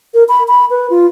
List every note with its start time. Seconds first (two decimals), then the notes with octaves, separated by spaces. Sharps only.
0.14 A#4
0.29 B5
0.48 B5
0.71 B4
0.90 F4